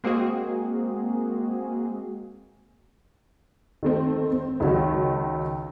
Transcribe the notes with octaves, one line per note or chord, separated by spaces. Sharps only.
G#3 A#3 C4 F#4 G#4
D#3 A3 C4
C4
C#2 D#3 F#3